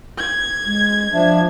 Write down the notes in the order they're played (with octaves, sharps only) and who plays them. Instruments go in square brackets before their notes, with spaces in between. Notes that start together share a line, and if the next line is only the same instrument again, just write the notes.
[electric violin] G#6
[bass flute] G#3
[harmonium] F3 D4 [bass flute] E5